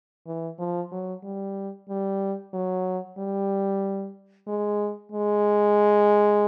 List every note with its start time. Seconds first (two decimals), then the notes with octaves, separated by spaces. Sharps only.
0.26 E3
0.59 F3
0.91 F#3
1.24 G3
1.89 G3
2.53 F#3
3.18 G3
4.47 G#3
5.12 G#3